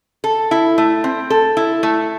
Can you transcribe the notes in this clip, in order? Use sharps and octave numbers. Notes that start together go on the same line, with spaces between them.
A4
E4
A3
C4
A4
E4
A3